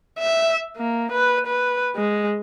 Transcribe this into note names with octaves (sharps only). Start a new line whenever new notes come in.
E5
A#3
B4
B4
G#3